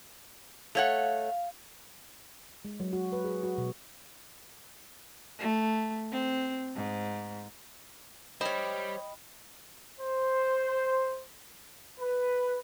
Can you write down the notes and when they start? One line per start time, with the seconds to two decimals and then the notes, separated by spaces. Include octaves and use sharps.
0.75 A3 C#5 F5 F#5
2.65 G#3
2.80 F#3
2.93 F#4
3.12 B4
3.24 G#4
3.43 F#4
3.58 B2
5.39 A3
6.12 C4
6.76 G#2
8.41 G3 C5 C#5 D#5 G5 B5
9.98 C5
12.00 B4